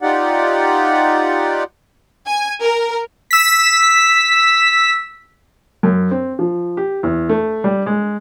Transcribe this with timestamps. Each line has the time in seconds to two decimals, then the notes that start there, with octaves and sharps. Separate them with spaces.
0.02 D#4 F4 G4 D5 F#5
2.27 G#5
2.62 A#4
3.31 E6 B6
5.83 F#2
6.11 C4
6.39 F3
6.77 G4
7.03 E2
7.29 A3
7.64 G3
7.86 G#3